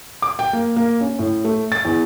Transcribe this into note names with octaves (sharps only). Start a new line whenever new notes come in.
D6
G5
A#3
A#3
C#4
A2
A3
A6
E2